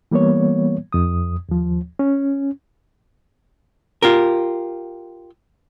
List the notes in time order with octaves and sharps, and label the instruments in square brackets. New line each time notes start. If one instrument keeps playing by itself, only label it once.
[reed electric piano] E3 G3 A#3 B3 C#5
F2 D#6
D#2 F3
C#4
[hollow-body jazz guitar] F4 G4 A#4